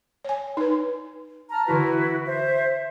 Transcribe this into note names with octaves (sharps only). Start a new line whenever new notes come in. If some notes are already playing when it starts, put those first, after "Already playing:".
C#5 G#5
D#4 B4
A5 A#5 F6
D3 E3 E4 F#4 B4 A5
C5 E5